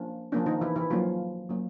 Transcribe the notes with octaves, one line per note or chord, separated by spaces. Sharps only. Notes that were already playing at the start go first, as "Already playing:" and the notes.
Already playing: F3 A#3 C#4 D4
F3 A#3 C#4 D4
D#3 D#4
E3 E4
E3 E4
F3 F#3 A#3 C#4 F4
F#3 A#3 C#4